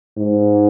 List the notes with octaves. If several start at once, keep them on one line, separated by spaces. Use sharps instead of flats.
G#2